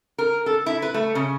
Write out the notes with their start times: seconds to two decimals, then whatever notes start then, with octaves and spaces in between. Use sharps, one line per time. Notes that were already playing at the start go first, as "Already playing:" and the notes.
0.18 A#4
0.46 A4
0.66 E4
0.82 B4
0.94 A3
1.15 C#3